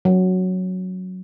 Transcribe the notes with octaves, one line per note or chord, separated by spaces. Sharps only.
F#3